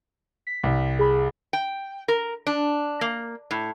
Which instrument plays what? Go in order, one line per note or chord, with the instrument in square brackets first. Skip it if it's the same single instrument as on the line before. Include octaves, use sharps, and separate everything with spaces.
[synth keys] B6
[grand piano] C2
[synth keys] G#4 B5
[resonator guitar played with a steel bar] G5
A#4
D4
A#3
A2